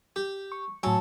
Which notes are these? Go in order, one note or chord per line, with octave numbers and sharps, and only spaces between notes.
G4
C#6
A2 F#3 A4 G#5